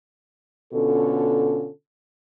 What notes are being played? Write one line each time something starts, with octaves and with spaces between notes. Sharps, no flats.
B2 D3 C#4 F4 A4